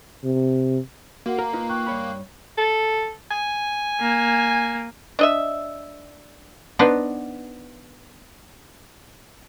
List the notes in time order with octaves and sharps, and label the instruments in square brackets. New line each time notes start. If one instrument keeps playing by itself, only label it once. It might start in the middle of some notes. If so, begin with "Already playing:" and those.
[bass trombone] C3
[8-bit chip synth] A#3 [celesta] F#4 A#4 F#5
[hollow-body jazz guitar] A#4 [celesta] A#5
[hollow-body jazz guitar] D#4 F4 B4
[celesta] G5 C#6 F#6
[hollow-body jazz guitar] G2 C#5 B5
[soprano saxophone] A4
G#5
[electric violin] A#3
[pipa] D4 D#5 E5
[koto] B3 D4 D#4 B4 C5